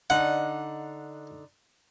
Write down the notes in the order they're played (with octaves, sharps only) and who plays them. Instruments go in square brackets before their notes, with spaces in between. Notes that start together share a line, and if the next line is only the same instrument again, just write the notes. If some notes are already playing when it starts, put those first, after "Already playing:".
[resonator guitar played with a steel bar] D3 D#4 [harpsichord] F#5